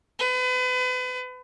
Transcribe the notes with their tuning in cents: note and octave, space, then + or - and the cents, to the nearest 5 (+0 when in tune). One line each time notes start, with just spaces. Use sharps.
B4 +35